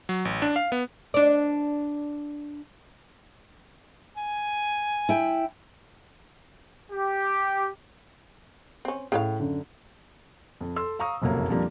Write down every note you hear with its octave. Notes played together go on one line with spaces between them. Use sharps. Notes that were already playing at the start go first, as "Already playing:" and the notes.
F#3
A1
D4
F5
B3
D4 D5
G#5
E4 G5
G4
C4 C#4
A2 C#3 C#4 F5
F#2 D3
F2
A4 C6 E6
F5 A#5 C#6 D#6
F#1 C2 F2 F#3 A#3 C#5
F2 D3 F3 G3 A#3